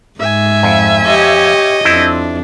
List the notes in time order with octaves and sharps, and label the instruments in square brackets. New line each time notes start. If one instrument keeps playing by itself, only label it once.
[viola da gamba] G#2 [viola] E5 G#5
[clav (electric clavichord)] F2
[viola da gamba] G4 C#5 [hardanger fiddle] D#5
[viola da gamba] F2 D4 [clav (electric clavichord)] C4 E4